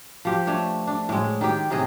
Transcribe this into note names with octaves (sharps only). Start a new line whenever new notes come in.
F3 G4
A3 D4 C#5
D4
A2 G#3
D#3 G4
A2 C3 G#4 D#5